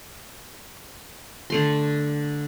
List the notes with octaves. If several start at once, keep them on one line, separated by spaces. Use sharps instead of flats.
D3 A3 C6